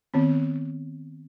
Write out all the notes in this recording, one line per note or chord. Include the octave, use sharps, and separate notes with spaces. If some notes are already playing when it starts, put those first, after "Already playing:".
D#3 B3 C4